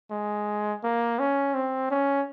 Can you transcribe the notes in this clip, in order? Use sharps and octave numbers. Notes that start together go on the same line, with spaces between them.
G#3
A#3
C#4
C4
C#4